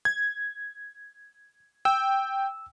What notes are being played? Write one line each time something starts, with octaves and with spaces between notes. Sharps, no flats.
G#6
G5 E6